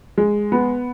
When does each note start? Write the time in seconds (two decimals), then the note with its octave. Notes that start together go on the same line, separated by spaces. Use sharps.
0.18 G#3
0.52 B3